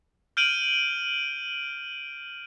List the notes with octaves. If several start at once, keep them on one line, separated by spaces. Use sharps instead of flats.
F6 G6 D7 D#7 F#7